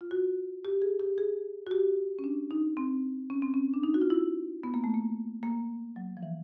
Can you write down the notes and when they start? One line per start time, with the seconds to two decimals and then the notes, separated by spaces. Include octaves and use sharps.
0.01 F4
0.11 F#4
0.65 G4
0.82 G#4
1.00 G4
1.18 G#4
1.67 F#4
1.71 G4
2.19 C#4
2.24 D4
2.51 D#4
2.77 C4
3.30 C#4
3.42 C4
3.54 C#4
3.74 D4
3.83 D#4
3.94 F#4
4.02 F4
4.10 E4
4.63 B3
4.74 A#3
4.84 A3
4.94 A#3
5.43 A#3
5.96 F#3
6.17 F3
6.23 E3